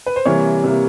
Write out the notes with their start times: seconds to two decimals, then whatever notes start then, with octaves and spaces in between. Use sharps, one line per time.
0.06 B4
0.16 C5
0.26 C3 E3 G3 A#3 C#5
0.64 C3 E3 G3 A#3